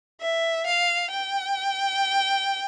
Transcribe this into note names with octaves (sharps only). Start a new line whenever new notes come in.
E5
F5
G5